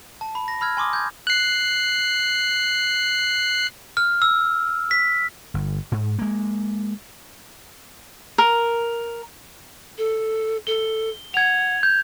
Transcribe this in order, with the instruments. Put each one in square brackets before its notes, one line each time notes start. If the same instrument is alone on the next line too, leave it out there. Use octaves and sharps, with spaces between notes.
[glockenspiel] A5
B5
A#6
B5 E6 F6 G#6
G#5 C6 D6 D#6
G6 G#6
[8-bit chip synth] F#6 C7
[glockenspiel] F6
E6
B6
[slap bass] G1
G#2
G#3 A#3
[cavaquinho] A#4
[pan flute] A4
[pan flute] A4 [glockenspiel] G7
[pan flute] F#5 [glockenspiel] G#6 F7
[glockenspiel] G6